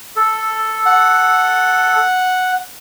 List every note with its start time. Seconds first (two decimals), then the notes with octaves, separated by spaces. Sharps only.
0.16 A4
0.86 F#5